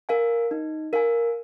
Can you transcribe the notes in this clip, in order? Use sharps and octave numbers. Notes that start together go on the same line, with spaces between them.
A#4 F5 G#5
D#4
A#4 F5 G#5